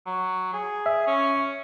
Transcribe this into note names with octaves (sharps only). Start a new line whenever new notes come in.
F#3
G#4
E5
C#4